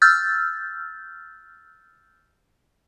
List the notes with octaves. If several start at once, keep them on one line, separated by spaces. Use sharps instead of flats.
E6 F6 G6 A6